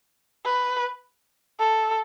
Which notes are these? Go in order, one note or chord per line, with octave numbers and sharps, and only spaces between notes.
B4
A4